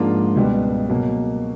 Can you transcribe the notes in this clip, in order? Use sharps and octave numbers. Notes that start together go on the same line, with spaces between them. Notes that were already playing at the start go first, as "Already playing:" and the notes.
Already playing: G#2 F3 A#3 D4 F4
C#2 B2 G3 B3
B2 F#3 A#3